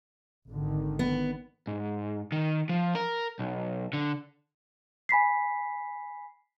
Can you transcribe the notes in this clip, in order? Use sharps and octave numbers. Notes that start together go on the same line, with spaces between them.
G#1 D3 D#3
B3
G#2
D#3
F3
A#4
B1
D3
G#5 B5 B6 C7